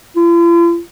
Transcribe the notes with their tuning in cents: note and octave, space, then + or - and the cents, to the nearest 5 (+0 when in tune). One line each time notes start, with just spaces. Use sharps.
F4 -45